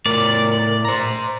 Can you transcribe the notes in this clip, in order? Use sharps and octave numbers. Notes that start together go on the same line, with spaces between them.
A2 A#4 D5
C5 A#5